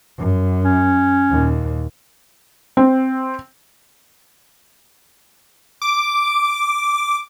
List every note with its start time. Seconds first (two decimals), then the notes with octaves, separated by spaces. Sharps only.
0.18 F#2
0.64 C#4
1.30 D#2 A#2
2.77 C4
5.82 D6